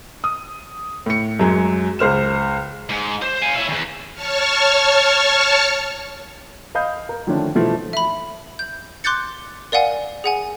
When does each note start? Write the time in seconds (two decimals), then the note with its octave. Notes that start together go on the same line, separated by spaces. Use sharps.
0.24 D#6
1.06 A2 C#7
1.39 F#2 F#3 G#3
1.99 C#2 C5 F6 E7
2.90 G#2
3.22 C5
3.42 F5 G#5
3.56 E4 C#5
3.69 E2 D#3
4.14 C#5 A5 C#6 F6
6.75 D#5 F5 B5 D#6 G6
7.09 A#4
7.27 D3 D#3 F3 A3 C#4 D4
7.55 B2 E3 F3 A3
7.93 E5 B5
8.59 G6
9.04 C6 D6 F#6 G6 A6 C#7
9.72 A#4 D5 F5 F#5 G#5
10.24 G#4 F#5 G#5